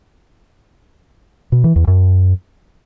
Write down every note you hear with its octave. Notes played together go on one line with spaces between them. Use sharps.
B2
E3
E2
F#2